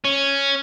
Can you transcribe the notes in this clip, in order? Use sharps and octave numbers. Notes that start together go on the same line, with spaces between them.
C#4